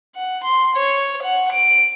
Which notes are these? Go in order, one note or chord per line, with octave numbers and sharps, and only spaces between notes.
F#5
C6
C#5
F#5
D7